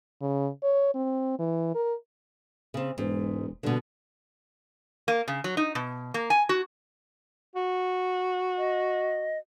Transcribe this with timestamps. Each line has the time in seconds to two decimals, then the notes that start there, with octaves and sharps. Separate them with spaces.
0.21 C#3
0.63 C#5
0.95 C4
1.39 E3
1.75 A#4
2.74 C#3 C4
2.98 E1 G#2
3.63 G2 B2 D3
5.08 A#3
5.28 C#3
5.44 F#3
5.57 D#4
5.75 B2
6.14 A#3
6.30 G#5
6.49 F#4
7.56 F#4
8.58 D#5